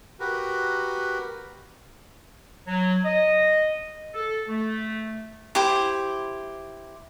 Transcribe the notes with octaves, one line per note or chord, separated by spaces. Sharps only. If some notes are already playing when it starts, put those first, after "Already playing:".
F#4 G4 A#4 B4
F#3
D#5
A4
A3
E4 G4 C5